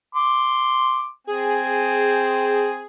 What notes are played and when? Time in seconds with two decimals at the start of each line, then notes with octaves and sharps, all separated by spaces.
0.15 C6 D6
1.27 C4 G#4 G#5